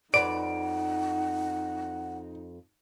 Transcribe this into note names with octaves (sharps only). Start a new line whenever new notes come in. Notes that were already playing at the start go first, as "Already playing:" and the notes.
F2 D#4 B4 D5 F#5 D7